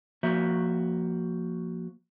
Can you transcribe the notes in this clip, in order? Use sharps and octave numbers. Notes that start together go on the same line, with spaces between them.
F3 A#3 F#4 C5 E5